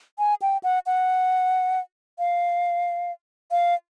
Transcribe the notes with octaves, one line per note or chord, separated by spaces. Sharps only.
G#5
G5
F#5
F#5
F5
F5